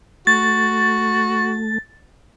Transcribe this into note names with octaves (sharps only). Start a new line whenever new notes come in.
A3 F#4 A6